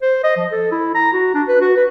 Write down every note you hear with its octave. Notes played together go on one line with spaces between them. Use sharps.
C5
D#5
F3
A4
E4
A#5
F#4
D4
B4
F#4
B4